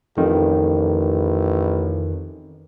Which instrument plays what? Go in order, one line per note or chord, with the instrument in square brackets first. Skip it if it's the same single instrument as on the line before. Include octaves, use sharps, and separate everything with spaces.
[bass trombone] A1 [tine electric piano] F2 D#3